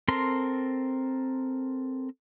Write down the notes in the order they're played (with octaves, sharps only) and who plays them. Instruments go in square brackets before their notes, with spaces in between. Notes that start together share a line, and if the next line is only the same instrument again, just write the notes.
[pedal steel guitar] C4 A4 A#4 C6